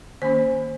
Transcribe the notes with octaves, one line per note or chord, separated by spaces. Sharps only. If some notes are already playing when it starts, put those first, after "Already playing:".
D#3 A#3 C#4 C5